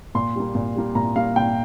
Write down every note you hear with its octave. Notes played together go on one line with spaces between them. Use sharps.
A#2 C6
G3 A#3
A#2
G3 A#3
A#2 A#5
G3 A#3 F5
A#2 G5